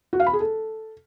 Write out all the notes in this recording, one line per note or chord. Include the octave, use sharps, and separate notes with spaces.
F#4
F5
B5
G#4
A4